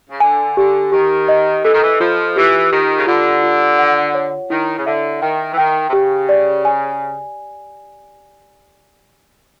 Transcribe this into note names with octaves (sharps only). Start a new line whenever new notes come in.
C#3
D3 G#5
D3 G4
D#3 G4
D#5
E3 A4
D#3
E3
F3 F4
E3 G4
D#3 G4
C#3
D3 F4
F4
F#5
C#5
D#3 E4
C#3
D3 E5
D#3 G5
E3
D#3 G5
C3
C#3 G4
D5
G#5